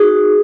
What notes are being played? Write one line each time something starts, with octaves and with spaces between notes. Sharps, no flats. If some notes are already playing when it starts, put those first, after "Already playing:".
Already playing: D#4 F#4 G#4